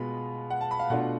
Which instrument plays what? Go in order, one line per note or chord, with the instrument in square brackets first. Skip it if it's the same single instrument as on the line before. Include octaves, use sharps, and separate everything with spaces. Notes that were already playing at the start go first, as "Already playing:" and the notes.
Already playing: [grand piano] B2 G#3 B3 F4 B5
F#5
A5
B5
F5
B2 A3 D4 F4 F#5